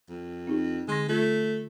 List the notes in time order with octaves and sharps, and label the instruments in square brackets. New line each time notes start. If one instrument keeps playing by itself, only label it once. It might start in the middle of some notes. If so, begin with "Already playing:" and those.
[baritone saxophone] F2
[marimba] C4 D#4 G4
[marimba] D3 C6 A#6 [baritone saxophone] G#3
[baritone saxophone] A3 [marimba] F4 G#6